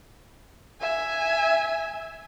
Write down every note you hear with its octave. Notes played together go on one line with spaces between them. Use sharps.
E5 G#5